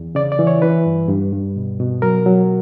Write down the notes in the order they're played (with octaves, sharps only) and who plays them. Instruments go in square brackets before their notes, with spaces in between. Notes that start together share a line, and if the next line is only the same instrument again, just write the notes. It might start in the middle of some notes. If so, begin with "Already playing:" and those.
Already playing: [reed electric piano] E2
C#3 D5
D5
E3
C#5
E3 B4
G2
G2
G2
B2
B2
F#3 A#4
F#3